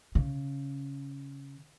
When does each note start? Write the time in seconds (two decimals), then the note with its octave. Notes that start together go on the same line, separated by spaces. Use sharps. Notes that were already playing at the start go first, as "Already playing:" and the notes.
0.15 C#3